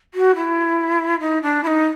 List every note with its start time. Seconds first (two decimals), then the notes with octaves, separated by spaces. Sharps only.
0.14 F#4
0.35 E4
1.20 D#4
1.42 D4
1.63 E4
1.67 D#4